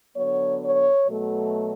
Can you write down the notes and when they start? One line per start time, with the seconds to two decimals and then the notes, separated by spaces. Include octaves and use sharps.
0.15 D3 F#3 B3 C#5
0.61 C#5
1.06 B2 F#3 A3